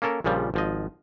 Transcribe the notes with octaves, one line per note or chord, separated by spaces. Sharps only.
A#3 C#4 A4 A#4
A#1 A#2 C#3 F3 G3
G#1 F3 D#5